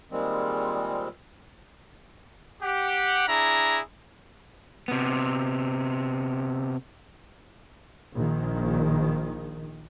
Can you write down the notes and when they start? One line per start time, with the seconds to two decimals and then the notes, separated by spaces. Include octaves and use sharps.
0.11 A#2 D#3 G3 G#3 C4
2.63 G4 F#5
3.28 D4 E4 G#4 A#5
4.88 C3 B3
8.15 A#1 D#3